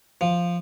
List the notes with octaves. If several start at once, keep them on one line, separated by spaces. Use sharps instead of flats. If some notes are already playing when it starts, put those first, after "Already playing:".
F3